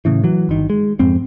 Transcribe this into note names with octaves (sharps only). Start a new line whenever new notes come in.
A2 C#3 E3
E3 F#3
G1 D#3
G#3
F2 G#2 C4